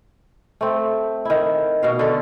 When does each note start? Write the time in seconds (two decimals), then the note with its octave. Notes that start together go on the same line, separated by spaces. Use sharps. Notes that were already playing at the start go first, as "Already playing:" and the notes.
0.61 A3 C4
1.25 D#3 E4
1.83 B2 F#4 F5
1.99 D3 A4